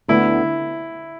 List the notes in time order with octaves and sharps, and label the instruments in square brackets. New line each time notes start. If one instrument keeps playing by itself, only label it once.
[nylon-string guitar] D2 D3 B3 D4 [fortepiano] E4